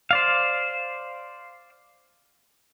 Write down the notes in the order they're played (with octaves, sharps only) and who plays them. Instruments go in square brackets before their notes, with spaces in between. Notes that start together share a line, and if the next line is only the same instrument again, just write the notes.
[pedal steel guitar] C5 D5 F5